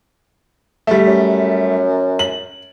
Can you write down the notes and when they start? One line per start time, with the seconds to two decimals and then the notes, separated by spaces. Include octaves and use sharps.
0.87 G3 A3
1.07 F#2
2.19 F#7